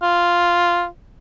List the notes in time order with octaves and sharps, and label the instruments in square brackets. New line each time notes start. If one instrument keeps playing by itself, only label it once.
[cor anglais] F4